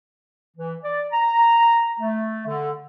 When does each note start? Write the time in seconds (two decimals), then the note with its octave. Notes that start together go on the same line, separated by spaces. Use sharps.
0.56 E3
0.83 D5
1.12 A#5
2.00 A3
2.46 D3